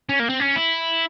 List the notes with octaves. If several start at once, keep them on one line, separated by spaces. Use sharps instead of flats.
C#4
A#3
C4
C#4
E4